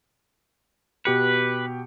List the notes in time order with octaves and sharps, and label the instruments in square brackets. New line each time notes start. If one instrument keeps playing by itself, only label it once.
[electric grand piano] B2 G4 C#7 [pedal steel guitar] B4